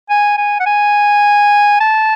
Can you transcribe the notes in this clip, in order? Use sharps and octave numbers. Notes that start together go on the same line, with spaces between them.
G#5
G#5
F#5
G#5
A5